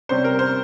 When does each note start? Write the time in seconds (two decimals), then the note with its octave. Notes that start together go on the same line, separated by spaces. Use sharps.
0.09 C3 G3 C#4 C5
0.24 A#4
0.39 C5